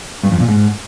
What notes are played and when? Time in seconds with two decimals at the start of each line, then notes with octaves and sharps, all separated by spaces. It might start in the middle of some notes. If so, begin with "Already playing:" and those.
0.23 G2
0.32 F2
0.40 A#2
0.48 G#2